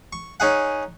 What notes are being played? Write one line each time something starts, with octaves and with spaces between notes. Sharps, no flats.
C#6
C#4 D#4 G#4 F#5